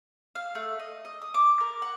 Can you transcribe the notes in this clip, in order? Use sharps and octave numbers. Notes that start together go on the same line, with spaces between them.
F5
A3
D#5
D#5
D#6
D6
A#4
F#5